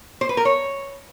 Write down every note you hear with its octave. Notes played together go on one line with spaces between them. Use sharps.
C5
B4
A#4
C#5